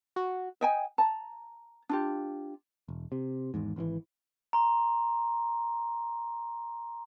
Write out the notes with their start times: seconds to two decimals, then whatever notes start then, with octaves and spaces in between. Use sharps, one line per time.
0.16 F#4
0.61 D#5 G5 G#5
0.98 A5 A#5
1.89 D4 F4 G4
2.88 E1
3.12 C3
3.54 G#1 E2 G#2
3.76 G#1 D3 E3
4.53 A#5 C6